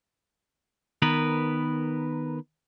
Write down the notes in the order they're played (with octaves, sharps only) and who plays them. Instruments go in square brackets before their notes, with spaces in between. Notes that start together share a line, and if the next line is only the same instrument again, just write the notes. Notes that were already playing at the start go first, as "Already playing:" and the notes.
[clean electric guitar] D#3 B3 A#4 B4